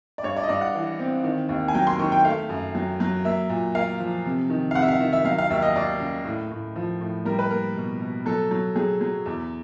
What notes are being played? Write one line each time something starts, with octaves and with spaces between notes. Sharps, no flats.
D5
G2 C#5
D5
D#5
G2 D5
F#5
E3
C4
D#3
D#2
G#5
F#3 G5
C6
D#3 C#6
G5
A3 F5
F#2
F#3
F#3
A#3 E5
A#2
A#3 F5
F3
C3
D#3
F5
C3 F#5
E5
F5
D#3 E5
E5
F#3 F5
F5
D#2 E5
D#5
D#2 D5
C#3
A2
A2
F3
A2
G3 A#4
B4
A#3 A#4
B2
B2
F#3 A4
F#3
F#3 G#4
F#3
E2